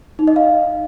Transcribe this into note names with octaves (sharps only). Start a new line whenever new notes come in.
D#4
D#5
F5